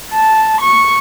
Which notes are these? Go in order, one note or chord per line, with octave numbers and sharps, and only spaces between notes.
A5
C#6